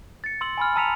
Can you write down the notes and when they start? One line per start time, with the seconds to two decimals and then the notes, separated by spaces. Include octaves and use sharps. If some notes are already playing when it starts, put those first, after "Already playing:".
0.24 A6 C#7
0.41 C6 E6 F#7
0.57 G#5 B5 F6
0.76 A5 A#5 E6 B6 C#7 F7